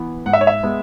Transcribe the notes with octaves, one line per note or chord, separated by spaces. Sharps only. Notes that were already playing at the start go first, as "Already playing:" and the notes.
Already playing: E3 B3
G#2 F#5
E5
C#5
E5
G#3 B3